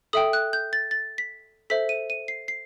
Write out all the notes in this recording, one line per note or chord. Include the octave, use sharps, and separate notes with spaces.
A4 E5 G5 D#6
F#6
G6
A6
A6
B6
A4 C5 E5 B6
D#7
D#7
C7
C7